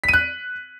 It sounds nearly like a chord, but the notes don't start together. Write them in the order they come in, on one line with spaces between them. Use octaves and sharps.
B6 D#7 F#6